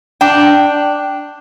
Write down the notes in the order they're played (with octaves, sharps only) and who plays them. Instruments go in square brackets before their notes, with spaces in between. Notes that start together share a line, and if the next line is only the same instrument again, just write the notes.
[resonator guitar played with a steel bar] D4 G5